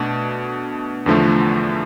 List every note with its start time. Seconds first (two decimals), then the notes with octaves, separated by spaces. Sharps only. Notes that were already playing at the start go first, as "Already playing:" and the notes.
Already playing: B2 A3 D4
1.06 E2 D3 F3 A3